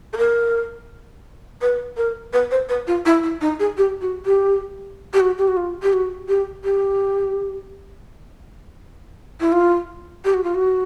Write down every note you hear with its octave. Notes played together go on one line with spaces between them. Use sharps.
A4
A#4
B4
A#4
B4
C5
B4
F4
E4
E4
D#4
G#4
G4
F#4
G4
G4
F#4
G4
F#4
F4
G4
F#4
G4
G4
E4
F4
G4
F#4
F4
F#4